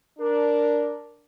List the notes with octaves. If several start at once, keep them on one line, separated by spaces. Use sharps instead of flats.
D4 A#4